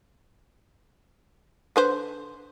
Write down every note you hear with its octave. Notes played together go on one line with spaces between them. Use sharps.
D3 B4 C5